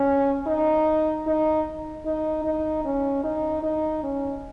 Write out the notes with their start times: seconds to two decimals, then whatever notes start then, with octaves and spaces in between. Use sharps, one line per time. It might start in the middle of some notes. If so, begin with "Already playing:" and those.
Already playing: C#4
0.47 D#4
1.27 D#4
2.06 D#4
2.45 D#4
2.85 C#4
3.24 D#4
3.63 D#4
4.03 C#4